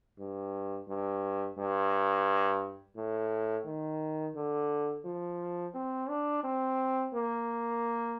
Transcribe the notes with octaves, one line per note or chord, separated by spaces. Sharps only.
G2
G2
G2
A2
D#3
D3
F3
C4
D4
C4
A#3